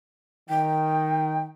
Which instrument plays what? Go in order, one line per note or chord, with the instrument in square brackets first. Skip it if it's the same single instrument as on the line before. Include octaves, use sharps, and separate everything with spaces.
[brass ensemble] D#3 [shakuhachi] G5